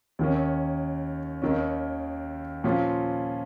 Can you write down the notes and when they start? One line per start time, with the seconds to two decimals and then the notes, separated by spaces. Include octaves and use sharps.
0.19 D#2 D#3 C#4
1.42 D#2 D#3 C#4
2.64 A#2 F3 C#4 F4